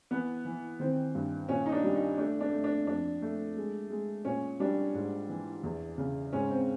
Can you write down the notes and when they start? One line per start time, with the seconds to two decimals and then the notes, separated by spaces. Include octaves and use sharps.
0.11 E3 B3
0.45 E3
0.80 D#3 C4
1.15 G2
1.49 A#2 C#4
1.66 D#4
1.72 D4
1.83 G3
1.96 D#4
2.18 A3 D4
2.41 D4
2.52 A3
2.64 D4
2.87 F2 D4
3.22 A3
3.56 G#3
3.90 G#3
4.25 A#2 C#4
4.60 G3 D4
4.95 G#2
5.29 E3
5.63 E2
5.98 C#3
6.33 G#2 C#4
6.50 C4